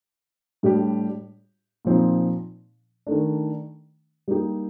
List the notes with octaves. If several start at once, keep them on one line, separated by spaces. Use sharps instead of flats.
A2 G3 D4 G4
A#2 F3 C4 D#4
D#3 A3 D4
G3 A#3 D#4 G4